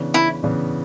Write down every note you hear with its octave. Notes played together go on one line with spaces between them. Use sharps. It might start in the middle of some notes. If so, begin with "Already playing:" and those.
Already playing: C#3 E3 B3 D4
E4
C#3 E3 B3 D4